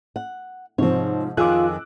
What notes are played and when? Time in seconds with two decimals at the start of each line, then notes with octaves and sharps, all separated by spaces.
0.16 F#5
0.78 G#2 C3 F3 C4 C#5
1.37 F2 D#3 F4 G#4 D6 E6 F#6